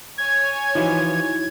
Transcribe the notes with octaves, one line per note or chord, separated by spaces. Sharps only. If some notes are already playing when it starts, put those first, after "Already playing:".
C#5 G#5 G#6
E3 F3 D#4 E4 F#4